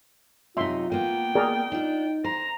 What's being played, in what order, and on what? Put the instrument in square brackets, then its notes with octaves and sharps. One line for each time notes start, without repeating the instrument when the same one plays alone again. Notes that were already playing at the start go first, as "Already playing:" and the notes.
[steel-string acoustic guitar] F#2 C3 D#4 [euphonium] F4 [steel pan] E5 C6
[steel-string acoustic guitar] A#3 B3 [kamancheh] G5
[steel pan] G#4 A#4 D5
[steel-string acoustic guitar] D4 F4 [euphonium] D#4
[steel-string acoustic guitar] C5 [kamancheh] A#5